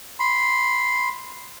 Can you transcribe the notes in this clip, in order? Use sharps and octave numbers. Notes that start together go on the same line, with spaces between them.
B5 C6